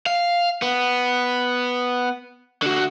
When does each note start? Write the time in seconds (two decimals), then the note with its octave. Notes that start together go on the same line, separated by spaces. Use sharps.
0.06 F5
0.62 B3
2.62 D3 F#4